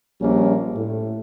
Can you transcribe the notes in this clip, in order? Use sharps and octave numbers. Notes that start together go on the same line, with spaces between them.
A#1 G3 A#3 C#4
A2